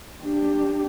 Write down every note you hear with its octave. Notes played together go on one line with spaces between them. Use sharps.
D4 G4